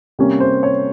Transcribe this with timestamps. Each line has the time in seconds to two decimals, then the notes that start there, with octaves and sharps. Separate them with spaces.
0.19 C3 G3 A#3 C#4
0.40 C5
0.63 C#5